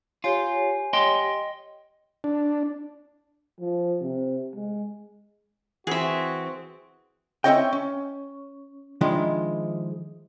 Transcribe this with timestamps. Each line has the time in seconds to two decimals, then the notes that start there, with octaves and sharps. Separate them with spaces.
0.24 F4 G4 C#5 G#5
0.93 D#5 G5 C6
2.24 D4
3.59 F3
4.01 C3
4.55 G#3
5.87 E3 C4 F#4 G#4 E5
7.44 C4 C#4 E4 C#5 D#5 G5
7.73 C#4
9.01 D#3 F3 G#3 D4 E4